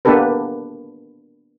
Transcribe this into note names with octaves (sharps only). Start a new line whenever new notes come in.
A#3 B3 D4 G4 A4 B4